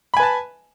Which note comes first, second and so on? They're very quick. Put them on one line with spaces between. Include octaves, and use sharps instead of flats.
B5 G#5 B4 A5